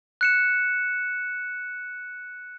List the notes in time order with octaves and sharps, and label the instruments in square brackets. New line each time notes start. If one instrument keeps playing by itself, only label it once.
[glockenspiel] F#6 C#7 E7